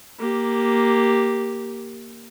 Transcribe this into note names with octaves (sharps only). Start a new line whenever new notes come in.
A#3 G4